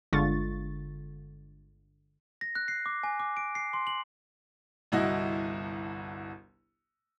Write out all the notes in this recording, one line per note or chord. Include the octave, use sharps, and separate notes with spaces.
G1 D3 G#3 F4 C#6 A6
A#6
F#6
C7
D6
G#5
D6
D7
C7
C6
F#7
G1 C2 E4 F#4 D#5